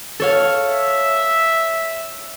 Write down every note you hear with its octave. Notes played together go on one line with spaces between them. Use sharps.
A4 C#5 F5
E5